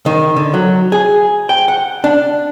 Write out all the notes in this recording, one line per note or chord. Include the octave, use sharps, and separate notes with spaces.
D#3
D3
F#3
G#4
G5
F#5
D4